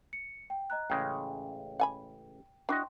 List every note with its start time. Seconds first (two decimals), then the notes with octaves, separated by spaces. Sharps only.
0.13 C#7
0.50 G5
0.70 D#5 A#5 F#6
0.90 A1 C#3 G#3 G5
1.80 F#5 G#5 B5
2.69 D4 E4 F#4 D#5 G5 C6